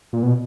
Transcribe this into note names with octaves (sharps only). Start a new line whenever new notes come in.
A#2
B2